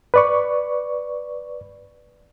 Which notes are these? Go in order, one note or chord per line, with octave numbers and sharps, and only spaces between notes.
B4 D5 C#6